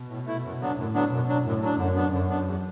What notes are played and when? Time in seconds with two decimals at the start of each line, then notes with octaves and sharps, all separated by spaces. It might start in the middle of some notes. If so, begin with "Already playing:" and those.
Already playing: B2
0.09 A2
0.26 A3 E4
0.43 F#2
0.60 D3 F#3 B3 D4
0.77 F#2 A2
0.93 D3 F#3 B3 D4
1.11 F#2 B2
1.27 F#3 D4
1.44 F#2 A2
1.61 F#3 D4
1.78 F#2 D3
1.95 B3 D4
2.11 F#2 D3
2.29 B3 D4
2.46 E2